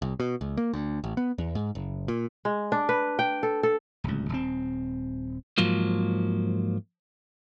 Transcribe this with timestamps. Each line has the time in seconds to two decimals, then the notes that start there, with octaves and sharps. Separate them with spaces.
0.02 C2
0.20 B2
0.41 C#2
0.57 A#3
0.74 D2
1.04 A1
1.17 B3
1.38 E2
1.55 G#2
1.75 F#1
2.08 A#2
2.45 G#3
2.72 D4
2.89 B4
3.19 G5
3.43 A4
3.63 A4
4.04 D1 C#2
4.29 D#1 C4
5.58 G#2 F3 F#3 A#3